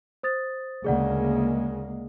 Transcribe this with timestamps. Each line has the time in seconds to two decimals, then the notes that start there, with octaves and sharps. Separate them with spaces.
0.23 C5 D#6 A6
0.84 D2 C#3 G#3 A#3 G#4 D5 F#5